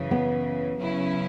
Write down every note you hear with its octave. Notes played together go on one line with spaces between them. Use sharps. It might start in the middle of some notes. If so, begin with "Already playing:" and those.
Already playing: F#2 C#3 E3
B3
C#3 F#3 C#4 E4